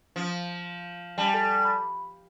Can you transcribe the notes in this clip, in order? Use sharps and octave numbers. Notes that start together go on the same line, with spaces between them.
F3
G3 A5
G#5
A4 A5
B5